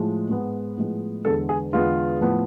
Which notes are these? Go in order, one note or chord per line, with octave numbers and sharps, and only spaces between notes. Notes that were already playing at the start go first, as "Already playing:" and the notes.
Already playing: A2 F3 G#3
G#2 G#3 B3
A2 F3 G#3 B3
E2 D3 G#3 B3 A4
G#4
E2 D3 G#3 B3 F4
A2 F3 B3